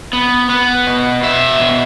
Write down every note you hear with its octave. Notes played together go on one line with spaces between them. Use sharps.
B3
B3
B2
B2 E5
B2